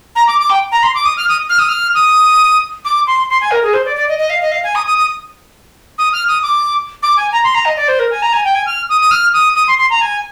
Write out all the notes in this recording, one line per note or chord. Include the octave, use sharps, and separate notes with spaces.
A#5
D6
D6
G5
A#5
C6
D6
D#6
F6
D#6
F6
D#6
F6
D#6
D6
C6
C6
G#5
A#4
G#4
C5
D5
D5
D#5
D#5
F5
D#5
F5
G#5
D#6
D#6
D#6
D#6
F6
D#6
D6
D6
G#5
A#5
C6
A#5
D#5
D5
C5
A#4
G#5
A#5
G#5
G5
G#5
F6
D#6
D#6
F6
D#6
D#6
C6
C6
A#5
G#5